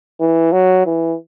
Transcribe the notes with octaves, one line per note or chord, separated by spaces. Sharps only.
E3
F#3
E3